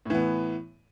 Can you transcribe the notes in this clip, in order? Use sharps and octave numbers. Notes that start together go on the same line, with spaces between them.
A2 E3 B3